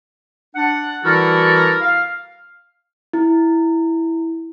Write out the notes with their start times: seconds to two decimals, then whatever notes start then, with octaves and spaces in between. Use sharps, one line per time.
0.56 D4 F#5
1.04 E3 G3 E4 F#4 A4 A#4
1.82 F5
3.13 E4